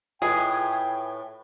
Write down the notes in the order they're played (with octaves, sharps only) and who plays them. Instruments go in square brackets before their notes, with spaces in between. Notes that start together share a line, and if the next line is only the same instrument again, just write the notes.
[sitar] A2 B4 [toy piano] F4 D#5 G#5 [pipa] G#4 [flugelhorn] G5